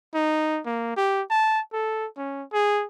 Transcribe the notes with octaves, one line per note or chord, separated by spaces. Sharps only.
D#4
A#3
G4
A5
A4
C#4
G#4